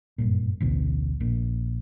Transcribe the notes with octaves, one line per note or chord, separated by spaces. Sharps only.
F#1 G2 A#2
A1 D2 B2
A#1 A#2